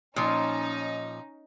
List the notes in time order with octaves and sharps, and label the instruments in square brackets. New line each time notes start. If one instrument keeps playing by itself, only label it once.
[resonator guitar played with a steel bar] A#2 F3 [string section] C#4 D#4